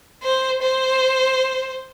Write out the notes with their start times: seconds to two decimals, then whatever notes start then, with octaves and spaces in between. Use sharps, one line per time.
0.24 C5
0.62 C5